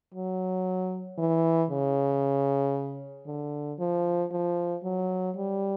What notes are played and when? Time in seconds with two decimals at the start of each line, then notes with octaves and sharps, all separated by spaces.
0.14 F#3
1.18 E3
1.70 C#3
3.26 D3
3.79 F3
4.31 F3
4.83 F#3
5.35 G3